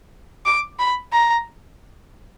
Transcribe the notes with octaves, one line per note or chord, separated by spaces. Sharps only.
D6
B5
A#5